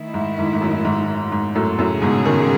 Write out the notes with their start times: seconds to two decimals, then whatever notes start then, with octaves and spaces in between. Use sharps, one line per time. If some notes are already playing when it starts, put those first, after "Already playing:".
Already playing: D#3 A3 E4
0.14 G#2
0.39 G#2
0.53 G#2
0.61 F#2
0.85 G#2
1.32 G#2
1.55 F#2 A2
1.78 F#2 A2 C#3 G#3 C#4 G#4
2.02 G#2 B2
2.25 B2 D#3